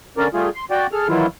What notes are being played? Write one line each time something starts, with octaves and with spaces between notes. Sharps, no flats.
D3 C#4 A#4 D5
G3 A3 F4 G#4
C6
F#4 D5 G5
G#4 A4 F6
D#3 E3 F#3 E4 F4